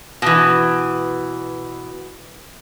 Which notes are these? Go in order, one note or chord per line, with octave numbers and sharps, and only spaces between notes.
B2 E3